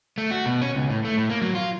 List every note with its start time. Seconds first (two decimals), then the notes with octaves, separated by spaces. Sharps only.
0.18 A3
0.31 F#4
0.46 B2
0.62 C#4
0.75 C#2
0.90 A2
1.05 A3
1.17 A2
1.30 A#3
1.42 F#3
1.55 F4